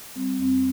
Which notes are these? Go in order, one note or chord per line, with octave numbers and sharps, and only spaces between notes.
G3 C4
F2 C4